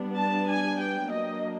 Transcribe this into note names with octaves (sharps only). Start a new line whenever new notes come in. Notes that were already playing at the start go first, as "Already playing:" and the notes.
Already playing: G3 B3 D4
A5
G#5
G5
F#3 A#3 D4 D#5